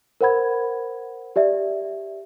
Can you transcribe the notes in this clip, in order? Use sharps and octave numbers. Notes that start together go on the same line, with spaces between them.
A#4 C5 F#5 B5 G#6
G4 D5 E5